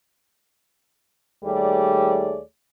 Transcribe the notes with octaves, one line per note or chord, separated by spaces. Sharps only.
D#2 G3 A3 G#4 C#5 D5